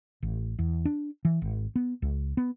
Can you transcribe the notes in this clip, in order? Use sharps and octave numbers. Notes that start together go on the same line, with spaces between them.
A1
E2
D4
E3
G#1
B3
C#2
B3